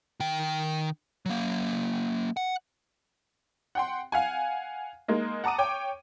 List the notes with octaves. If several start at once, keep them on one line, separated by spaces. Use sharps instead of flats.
D#3 G5
F#3 A#3
F#5
F#5 G5 C6
F5 F#5 G#5
G#3 A#3 D#4
F#5 A5 A#5 D6 D#6 D#7
C#5 G5 D6